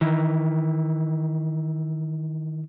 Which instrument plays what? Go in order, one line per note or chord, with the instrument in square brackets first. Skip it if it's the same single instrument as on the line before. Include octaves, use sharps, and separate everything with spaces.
[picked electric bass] D#3 E3